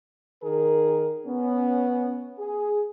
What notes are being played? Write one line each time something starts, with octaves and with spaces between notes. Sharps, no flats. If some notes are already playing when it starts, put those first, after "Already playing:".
D#3 G#4 A#4
B3 C#4
G#4